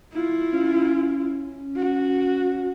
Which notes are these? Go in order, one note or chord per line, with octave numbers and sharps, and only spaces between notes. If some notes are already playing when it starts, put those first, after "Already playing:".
E4 F4
C#4
F#4